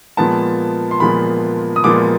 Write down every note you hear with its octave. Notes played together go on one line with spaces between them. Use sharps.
A#2 F3 G#3 B3 A5
C6
A#2 F3 G#3 B3 B5
D#6
A#2 F3 G#3 B3 D6